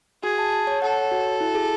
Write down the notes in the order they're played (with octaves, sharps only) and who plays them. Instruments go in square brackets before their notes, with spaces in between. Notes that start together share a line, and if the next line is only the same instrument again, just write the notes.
[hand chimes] F#4 [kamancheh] G#4
[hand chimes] A5
A5
C#5
[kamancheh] A4 [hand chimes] F#5
[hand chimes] C#5
F#4
F#4
E4
G#4